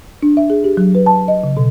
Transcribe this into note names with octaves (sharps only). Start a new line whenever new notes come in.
D4
E5
G#4
G4
F#3
B4
A5
D#5
C#3
B2